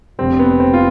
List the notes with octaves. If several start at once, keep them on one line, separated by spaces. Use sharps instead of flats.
F1 F2 D3 G3 C4
B3
C4
F4